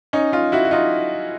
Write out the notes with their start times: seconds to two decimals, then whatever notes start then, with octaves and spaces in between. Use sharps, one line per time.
0.13 C#4 D#4
0.32 D#4 F4
0.52 E4 F#4
0.65 F#4
0.71 D#4 F4